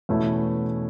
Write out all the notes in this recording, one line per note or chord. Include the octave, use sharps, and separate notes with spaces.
E2 B2 A3 C#4 E4